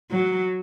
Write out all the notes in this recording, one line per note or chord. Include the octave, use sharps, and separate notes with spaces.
F#3